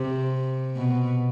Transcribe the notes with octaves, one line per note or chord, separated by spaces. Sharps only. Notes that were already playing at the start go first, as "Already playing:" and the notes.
Already playing: C3
B2